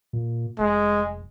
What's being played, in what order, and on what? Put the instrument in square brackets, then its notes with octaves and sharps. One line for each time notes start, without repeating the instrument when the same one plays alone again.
[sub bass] A#2
[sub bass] F1 [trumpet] G#3